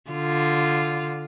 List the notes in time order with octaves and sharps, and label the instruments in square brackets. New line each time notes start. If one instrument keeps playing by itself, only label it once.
[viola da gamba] D3 F4